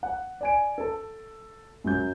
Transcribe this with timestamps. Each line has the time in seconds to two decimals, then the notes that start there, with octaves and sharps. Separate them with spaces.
0.03 F#5
0.41 D5 G#5 D7
0.78 A4 A5
1.84 F#2 F#3 G6